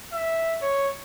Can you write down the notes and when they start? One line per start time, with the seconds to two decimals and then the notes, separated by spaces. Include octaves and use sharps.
0.13 E5
0.62 C#5